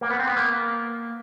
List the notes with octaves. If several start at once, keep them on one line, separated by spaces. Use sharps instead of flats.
A#3
B3
C4
B3
A#3